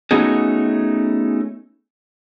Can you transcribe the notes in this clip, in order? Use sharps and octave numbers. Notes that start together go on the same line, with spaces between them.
A3 B3 C#4 D#4 F#4 G#4